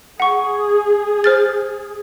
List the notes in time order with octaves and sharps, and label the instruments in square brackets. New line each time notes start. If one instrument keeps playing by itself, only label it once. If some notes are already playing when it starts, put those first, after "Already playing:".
[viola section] G#4 [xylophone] F#5 C#6
[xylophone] C5 F6 A6